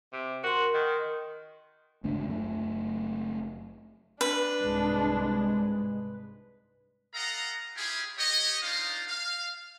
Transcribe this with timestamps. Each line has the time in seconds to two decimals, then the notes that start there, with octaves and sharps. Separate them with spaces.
0.13 C3
0.44 F#4 A#4 C6
0.74 D#3
2.04 G1 C#2 A3 D4
2.27 F#1 F#2 C3 A3
4.21 D4 B4
4.60 C2 G#2 G#3
7.14 A4 D#5 F5 F#5 A#5
7.76 E4 F4 G4 G#4
8.17 G4 C#5 D#5
8.63 A#3 D4 D#4 F4 C5 F5
9.08 F5